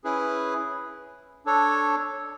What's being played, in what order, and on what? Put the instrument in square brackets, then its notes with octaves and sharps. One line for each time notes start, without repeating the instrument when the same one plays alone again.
[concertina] C#4 E4 G#4 B4
D4 A4 C#5